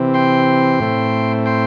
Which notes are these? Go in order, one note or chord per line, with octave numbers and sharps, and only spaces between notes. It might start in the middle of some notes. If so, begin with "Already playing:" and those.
Already playing: C3 E3 C4
G5 C6
A2 A3 C4
G5 C6